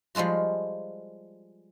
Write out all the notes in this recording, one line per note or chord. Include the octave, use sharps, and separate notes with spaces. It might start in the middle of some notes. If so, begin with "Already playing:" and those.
F3 G3 G#3 F4 F#4